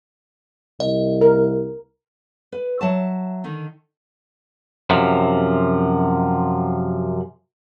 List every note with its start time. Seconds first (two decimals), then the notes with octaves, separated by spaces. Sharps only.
0.80 C2 D#5
1.21 A#4
2.52 B4
2.81 F#3 E5 A5
3.44 D3 D#3 D#4
4.90 F#2 C3 F3